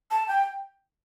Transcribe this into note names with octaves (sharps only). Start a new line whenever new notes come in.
A5
G5